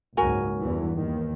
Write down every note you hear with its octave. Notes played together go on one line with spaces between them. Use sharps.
F#1 C#2 G#2 F#4 A#4 G#5
E2 G2 E3
D#2 D#3